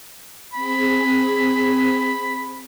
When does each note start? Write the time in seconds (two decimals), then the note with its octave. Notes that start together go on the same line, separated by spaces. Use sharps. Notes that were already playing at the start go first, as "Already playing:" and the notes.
0.54 C4 G#4 B5